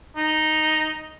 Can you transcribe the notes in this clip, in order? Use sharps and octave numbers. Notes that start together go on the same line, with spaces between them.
D#4